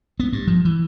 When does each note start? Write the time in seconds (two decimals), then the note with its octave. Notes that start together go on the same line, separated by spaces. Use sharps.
0.20 B3
0.33 G2
0.47 F3
0.65 E3